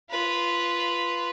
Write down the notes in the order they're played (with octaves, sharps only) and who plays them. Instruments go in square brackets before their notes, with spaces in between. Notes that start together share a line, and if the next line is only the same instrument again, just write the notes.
[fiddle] F4 B4